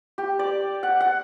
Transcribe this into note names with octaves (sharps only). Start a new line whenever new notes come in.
G4
D5
F#5
F#5